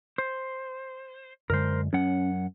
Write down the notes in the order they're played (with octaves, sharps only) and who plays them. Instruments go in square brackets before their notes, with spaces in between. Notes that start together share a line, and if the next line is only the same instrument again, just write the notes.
[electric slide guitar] C5
[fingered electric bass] F#2 D3 G#3 [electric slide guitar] A#4 C5
[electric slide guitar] F#2 F#5 [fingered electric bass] C#4